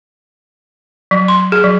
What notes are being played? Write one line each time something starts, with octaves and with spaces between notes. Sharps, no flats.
F#3
C6
G#4
F#3